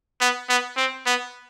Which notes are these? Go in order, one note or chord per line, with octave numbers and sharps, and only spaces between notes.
B3
B3
C4
B3